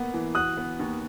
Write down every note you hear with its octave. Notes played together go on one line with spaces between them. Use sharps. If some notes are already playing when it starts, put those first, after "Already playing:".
Already playing: A#3 B3
E3
F#4 D#6 F#6
B3
D#2